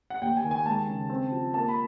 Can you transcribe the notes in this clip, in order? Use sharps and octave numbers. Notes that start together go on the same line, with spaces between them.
F#5
D#2 G5
G#5
D#3
G#5
G#3 A5
C#3
C4
F3
A#3 A5
B5